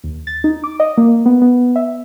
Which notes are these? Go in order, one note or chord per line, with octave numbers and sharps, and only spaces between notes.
D#2
A6
D#4
D6
D#5
A#3
B3
B3
E5